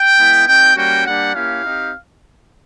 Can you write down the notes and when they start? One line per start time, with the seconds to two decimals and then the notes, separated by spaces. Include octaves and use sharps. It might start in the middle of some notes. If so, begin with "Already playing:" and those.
Already playing: G5
0.18 G#3 B3 E4
0.47 C4 D#4 F#4 G5
0.76 G3 A#3 C#4 F#4 G5
1.06 G3 A#3 D4 G4 F#5
1.34 A#3 C#4 E4 G4 F5
1.64 C4 D#4 G4